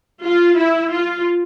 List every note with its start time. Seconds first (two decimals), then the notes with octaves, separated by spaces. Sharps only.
0.24 F4
0.58 E4
0.93 F4